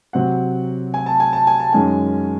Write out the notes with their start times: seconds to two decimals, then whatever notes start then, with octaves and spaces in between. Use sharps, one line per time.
0.13 C3 F#3 C4 F#5
0.94 G#5
1.06 A5
1.20 G#5
1.33 A5
1.47 G#5
1.60 A5
1.73 F#2 D#3 G#3 C#4 G#5